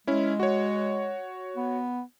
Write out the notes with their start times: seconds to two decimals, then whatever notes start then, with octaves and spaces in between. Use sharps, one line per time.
0.07 G#3 C#4 E4
0.40 F#4 C#5
1.56 B3